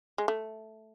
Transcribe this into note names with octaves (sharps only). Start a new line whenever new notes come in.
G#3
A3